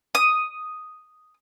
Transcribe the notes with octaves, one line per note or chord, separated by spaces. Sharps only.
D#6